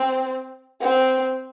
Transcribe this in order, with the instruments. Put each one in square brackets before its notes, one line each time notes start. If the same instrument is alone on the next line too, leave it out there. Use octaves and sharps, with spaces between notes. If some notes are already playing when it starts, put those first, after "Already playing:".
Already playing: [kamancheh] C4
C4